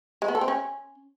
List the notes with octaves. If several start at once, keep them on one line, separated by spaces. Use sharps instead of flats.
G#3
B3
A4
C4
C#4